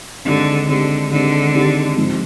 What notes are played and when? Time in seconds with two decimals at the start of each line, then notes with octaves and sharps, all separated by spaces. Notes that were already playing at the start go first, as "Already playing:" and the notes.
0.25 D3 D#3 G#3 C4 G4
0.68 D3 D#3 G#3 C4 G4
1.11 D3 D#3 G#3 C4 G4
1.54 D#3 G#3 C4 G4
1.97 G#2 F3 C4 F4